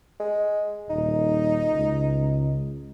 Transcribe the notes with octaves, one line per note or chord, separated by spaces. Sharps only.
G#3
D#1 D#4
C#2